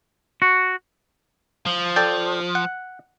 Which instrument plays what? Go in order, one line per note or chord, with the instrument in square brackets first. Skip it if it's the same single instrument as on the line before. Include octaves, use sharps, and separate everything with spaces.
[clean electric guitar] F#4
[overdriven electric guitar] F3
[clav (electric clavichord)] A4 D5 G5
F#5